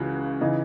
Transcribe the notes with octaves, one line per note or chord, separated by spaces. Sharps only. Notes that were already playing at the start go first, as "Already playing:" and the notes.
Already playing: C#2 C#3 E3 F#4
C#3 E3 D#4